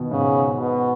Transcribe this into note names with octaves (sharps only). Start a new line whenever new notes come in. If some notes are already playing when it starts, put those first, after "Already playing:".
Already playing: B2 D#3
G#2 C#3
B2